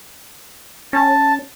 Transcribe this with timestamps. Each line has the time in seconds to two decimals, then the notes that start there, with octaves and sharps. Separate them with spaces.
0.93 C#4 A5